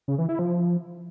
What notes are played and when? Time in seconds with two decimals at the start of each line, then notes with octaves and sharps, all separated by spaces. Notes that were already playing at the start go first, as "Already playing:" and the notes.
0.08 C#3
0.18 E3
0.29 E4
0.39 F3